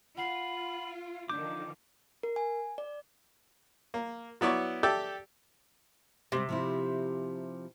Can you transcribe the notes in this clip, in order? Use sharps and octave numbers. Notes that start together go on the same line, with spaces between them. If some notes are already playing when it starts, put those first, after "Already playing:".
F4 F#5 B5 C7
D3 D#3 F3 D4 D6 G6
A#4
G#5
D5
A#3
F#3 B3 E4 D5 C#6 D6
G4 A4 D5 E5 G5
C3 G3 A3 C4
F3 C4 E4